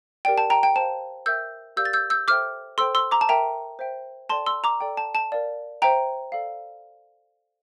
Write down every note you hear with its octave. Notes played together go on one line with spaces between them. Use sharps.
G4 A#4 D5 G5
A5
G5 A#5
G5
C5 F5 A5
A#4 E5 G5 E6 G6
G4 A#4 D5 F5 E6 G6
A6
E6 G6
E6 G6
A4 C5 E5 G5 D6 F6
A4 C5 G5 C6 E6
C6 E6
A#5 D6
A5
A#4 E5 G5 A#5
C5 E5 G5
A4 D5 G5 A5 C6
C6 E6
A#5 D6
A4 D5 G5
A5
A5
A#4 D5 F5
C5 E5 G5 A#5
A4 D5 F5